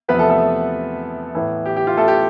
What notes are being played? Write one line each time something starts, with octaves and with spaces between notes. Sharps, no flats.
E2 C3 F3 A3 B3 B4
A3 A4
A3 A4
A2 E3 B3
G4
G4
F4
A3 A4
G4